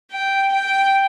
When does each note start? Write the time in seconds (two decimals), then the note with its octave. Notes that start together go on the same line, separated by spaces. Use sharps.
0.11 G5
0.54 G5